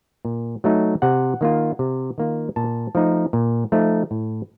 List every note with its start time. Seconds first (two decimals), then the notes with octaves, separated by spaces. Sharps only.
0.25 A#2
0.64 F#3 A3 D#4
1.02 C3 F#5
1.41 D#3 A#3 F4
1.79 C3
2.18 D#3 A#3 F4
2.56 A#2 A5
2.95 F3 A3 D#4
3.33 A#2
3.72 F3 A3 D#4
4.11 A2